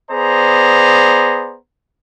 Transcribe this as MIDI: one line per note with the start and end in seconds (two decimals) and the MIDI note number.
0.10 1.57 59
0.10 1.57 68
0.10 1.57 72
0.10 1.57 74
0.10 1.57 82